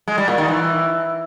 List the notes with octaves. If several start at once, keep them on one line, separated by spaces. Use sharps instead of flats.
G#3
G3
A#2
D#3
E3